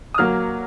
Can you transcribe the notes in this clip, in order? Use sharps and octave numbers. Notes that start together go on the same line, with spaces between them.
D#6
F#3 A#3 F6